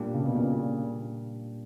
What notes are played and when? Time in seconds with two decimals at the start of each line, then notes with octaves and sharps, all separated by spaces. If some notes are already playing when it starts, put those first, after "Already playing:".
Already playing: A#2 G3 A#3 D4 G4
0.14 C#3
0.25 B2
0.34 A#2 C#3